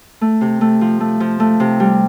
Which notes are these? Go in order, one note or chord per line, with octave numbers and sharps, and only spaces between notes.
A3
C3
A3
F3
A3
F3
A3
C3
G3